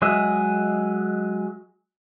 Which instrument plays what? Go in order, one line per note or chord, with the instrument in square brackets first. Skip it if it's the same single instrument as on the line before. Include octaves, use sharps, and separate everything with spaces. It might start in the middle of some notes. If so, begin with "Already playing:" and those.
[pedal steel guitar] F#3 G#3 G#4 D#5 E5